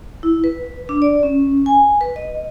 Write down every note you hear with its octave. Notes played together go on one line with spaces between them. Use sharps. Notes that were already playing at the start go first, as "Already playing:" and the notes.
E4
B4
D4
D5
C#4
G#5
B4
D#5